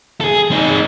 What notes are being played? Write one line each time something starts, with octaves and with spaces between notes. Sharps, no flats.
G#4 A4
C4 D#4